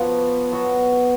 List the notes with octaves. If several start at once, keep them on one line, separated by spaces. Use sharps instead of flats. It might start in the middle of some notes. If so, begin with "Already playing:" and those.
Already playing: F3 B3 F#4
F#3 B3 F#4